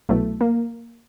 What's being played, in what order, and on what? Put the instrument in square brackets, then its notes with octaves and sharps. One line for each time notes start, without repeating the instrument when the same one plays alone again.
[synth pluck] C2 B2 F#3 B3 E4 [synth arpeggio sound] A3
[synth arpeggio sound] A#3